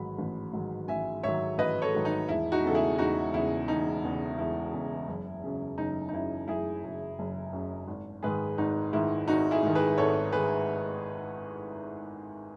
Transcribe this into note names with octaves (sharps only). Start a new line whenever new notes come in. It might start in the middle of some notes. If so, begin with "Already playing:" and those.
Already playing: A1 G#2 D#3 F#3 B5
A1
G#2 D#3 F#3
A1 E5 G#5
G#2 D#3 F#3 C#5 E5
A1 B4 D#5
A4 C#5
G#2 D#3 F#3
D#4
E1 E4
D#4 F#4
E2 C#3 A4
E4 G#4
E1 D#4 F#4
E2 C#3 E4
E1 D#4
E2 C#3
E1 E4
E2 C#3
F#1
F#2 C#3
F#1 D#4
D#4
F#2 C#3 E4
F#1 E4 G#4
F#2 C#3
F#1
F#2 C#3
G#1
G#2 D#3 G#4 B4
G#1 D#4
G#2 D#3 E4
G#1 D#4 F#4
E4 G#4
G#2 D#3
G#4 B4
G#1 A4 C#5
D#3 G#4 B4